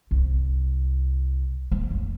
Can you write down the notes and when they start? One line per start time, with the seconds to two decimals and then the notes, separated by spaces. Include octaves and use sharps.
0.11 C2
1.71 A#3
1.91 F1